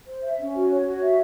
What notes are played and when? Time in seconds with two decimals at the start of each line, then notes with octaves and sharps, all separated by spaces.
0.08 C5
0.23 E5
0.39 C#4
0.55 F#4
0.70 C#5
0.86 F#4
1.02 E5